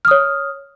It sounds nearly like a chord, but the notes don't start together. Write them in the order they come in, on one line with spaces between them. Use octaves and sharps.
F6 D#6 C#5